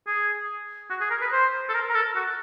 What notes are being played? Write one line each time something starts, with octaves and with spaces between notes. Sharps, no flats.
G#4
F#4
G#4
A#4
B4
C5
A4
A#4
A#4
A4
F#4